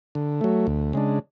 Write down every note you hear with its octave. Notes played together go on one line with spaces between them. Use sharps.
D3
F#3 A3
D2
C#3 G#3 D4